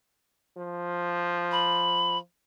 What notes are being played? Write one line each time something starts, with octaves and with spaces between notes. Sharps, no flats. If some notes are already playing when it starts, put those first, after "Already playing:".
F3
B5